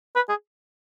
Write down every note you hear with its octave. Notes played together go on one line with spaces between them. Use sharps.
B4
G#4